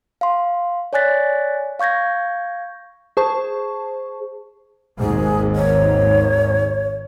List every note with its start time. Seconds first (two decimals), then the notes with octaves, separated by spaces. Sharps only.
0.21 F5 C6
0.93 C#5 D5 G#5 F#6 A6 B6
1.80 F5 C#6 G6 G#6 A#6
3.17 G#4 C5 A5 C#6
4.99 G#1 D#2 G#2 G#4
5.56 C#5